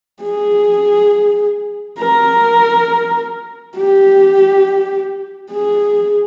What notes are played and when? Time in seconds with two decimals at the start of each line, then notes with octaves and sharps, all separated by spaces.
0.23 G#4
1.99 A#4
3.76 G4
5.52 G#4